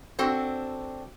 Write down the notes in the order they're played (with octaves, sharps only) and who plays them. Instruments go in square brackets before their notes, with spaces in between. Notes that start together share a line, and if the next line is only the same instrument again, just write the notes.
[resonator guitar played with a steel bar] C4 D4 F#4 A4 C5